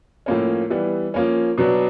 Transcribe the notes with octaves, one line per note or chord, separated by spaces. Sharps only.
A2 F3 A#3 C#4
E3 G3 B3
F3 A#3 C#4
B2 F#3 B3 D4